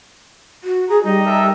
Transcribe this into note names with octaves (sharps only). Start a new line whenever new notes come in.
F#4
G#4 A#5
G3 D#4 D#5
A4 A#4 E5